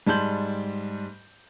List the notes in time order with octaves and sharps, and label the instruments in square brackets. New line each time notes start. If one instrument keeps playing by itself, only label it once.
[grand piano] G#2 G3 A5 C6 G6 F#7